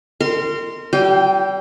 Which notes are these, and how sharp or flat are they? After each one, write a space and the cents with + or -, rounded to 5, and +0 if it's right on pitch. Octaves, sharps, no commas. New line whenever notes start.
A#4 -30 C6 -5
G3 -35 G5 +0